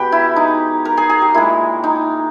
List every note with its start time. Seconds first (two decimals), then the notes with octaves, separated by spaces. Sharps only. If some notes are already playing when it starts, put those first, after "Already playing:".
Already playing: B2 G#3 G4 B4
0.12 E4
0.36 D#4
0.85 A#4
0.97 G#4
1.10 G#4
1.22 G4
1.34 A#2 G#3 E4
1.84 D#4